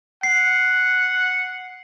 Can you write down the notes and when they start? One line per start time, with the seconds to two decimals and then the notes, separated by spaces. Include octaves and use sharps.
0.23 F#5 C7